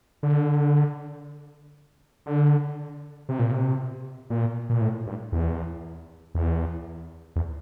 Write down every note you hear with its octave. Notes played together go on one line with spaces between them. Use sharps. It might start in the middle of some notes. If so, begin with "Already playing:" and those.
D3
D3
C3
A#2
C3
A#2
A#2
A2
G2
E2
E2
E2